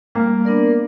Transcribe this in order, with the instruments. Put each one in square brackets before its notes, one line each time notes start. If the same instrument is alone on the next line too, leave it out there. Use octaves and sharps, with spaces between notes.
[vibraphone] G3 [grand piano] A#3
[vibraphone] B3 D4 A#4 D5